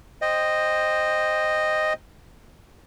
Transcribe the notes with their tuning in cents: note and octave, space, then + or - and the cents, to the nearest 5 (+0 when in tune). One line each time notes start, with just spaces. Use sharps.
C5 +0 D#5 -5 G5 +10